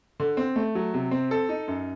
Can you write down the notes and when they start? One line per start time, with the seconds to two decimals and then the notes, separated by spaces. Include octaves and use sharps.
0.20 D3
0.37 C4
0.56 A3
0.75 F#3
0.94 C3
1.11 C4
1.31 A4
1.49 D#4
1.68 F#2